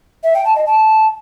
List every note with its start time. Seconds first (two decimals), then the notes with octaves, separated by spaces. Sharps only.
0.24 E5
0.34 G5
0.45 A5
0.55 D#5
0.66 A5